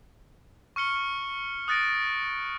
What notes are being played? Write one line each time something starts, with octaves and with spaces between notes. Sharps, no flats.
C#6 F6 C#7 G7
D#6 F#6 A6 A#6 D7